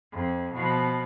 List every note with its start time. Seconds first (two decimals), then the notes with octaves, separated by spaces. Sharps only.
0.12 F2
0.54 B2 F3